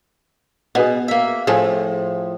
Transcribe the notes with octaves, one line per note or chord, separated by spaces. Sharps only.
B2 G#4 B4 F#5
A#3 E5
A2 F3 G#4 A4